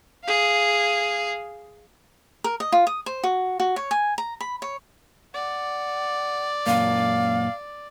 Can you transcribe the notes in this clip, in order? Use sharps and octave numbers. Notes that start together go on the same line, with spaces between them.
G#4 F5
A#4
D#5
F4
D#6
C5
F#4
F#4
C#5
G#5
A#5
B5
C#5
D5 F#5
F#2 A#2 A#3 F5